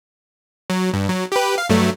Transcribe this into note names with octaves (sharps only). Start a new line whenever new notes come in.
F#3
G2
F#3
G4 B4
F5
G2 F#3 A3